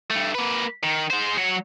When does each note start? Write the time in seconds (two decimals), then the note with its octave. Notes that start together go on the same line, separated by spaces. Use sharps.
0.11 G2 A3
0.35 A#3 B4
0.83 D#3
1.10 G#3 C5
1.37 F#3 C#5